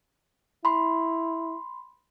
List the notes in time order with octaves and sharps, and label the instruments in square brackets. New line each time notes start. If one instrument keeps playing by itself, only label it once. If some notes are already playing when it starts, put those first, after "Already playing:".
[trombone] E4 [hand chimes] B5 C6